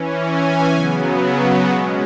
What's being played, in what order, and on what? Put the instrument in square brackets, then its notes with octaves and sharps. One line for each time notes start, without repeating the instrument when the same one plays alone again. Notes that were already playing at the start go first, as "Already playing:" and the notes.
Already playing: [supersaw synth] E3 C#4
G#5
C#3 F#3 B3
B2 G#3 C#4